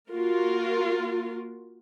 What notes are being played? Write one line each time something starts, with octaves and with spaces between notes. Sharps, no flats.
A#3 F4 F#4 A#4